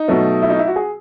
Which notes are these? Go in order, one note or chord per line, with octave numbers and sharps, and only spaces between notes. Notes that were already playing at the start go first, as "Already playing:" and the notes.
Already playing: D#4
B2 F#3 A3
E4
D#4
E4
F#4
G#4